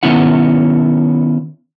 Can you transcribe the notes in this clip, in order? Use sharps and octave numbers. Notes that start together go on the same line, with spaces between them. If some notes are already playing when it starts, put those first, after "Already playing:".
D#3 B3 C#4 E4 F#5